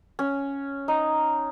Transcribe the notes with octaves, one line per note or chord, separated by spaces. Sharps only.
C#4
D#4